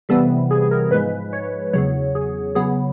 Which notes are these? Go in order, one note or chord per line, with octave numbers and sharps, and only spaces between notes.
C3 E3 G3 B3 A4
G#4
A#4
G#2 F3 G#3 B4
C#5
E2 C#3 F#3 C#5
G#4
C#3 F#3 B3 G#4